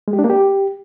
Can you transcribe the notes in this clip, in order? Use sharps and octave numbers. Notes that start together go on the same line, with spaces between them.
G#3
G4
D4
A#3
G4